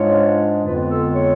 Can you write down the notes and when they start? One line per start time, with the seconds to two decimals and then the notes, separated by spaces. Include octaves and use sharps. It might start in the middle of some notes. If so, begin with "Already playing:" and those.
Already playing: G#2 G#3 D4 F4 C#5
0.64 F2 D3 G#3 B3 F4 B4
0.90 A4
1.15 C#5